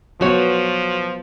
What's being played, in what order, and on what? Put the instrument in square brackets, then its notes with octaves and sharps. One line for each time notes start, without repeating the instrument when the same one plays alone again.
[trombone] F3 [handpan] F#3 B3 [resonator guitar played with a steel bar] F#4 C#5